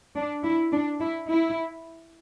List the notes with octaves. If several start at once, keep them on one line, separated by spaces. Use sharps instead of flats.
D4
E4
D4
E4
E4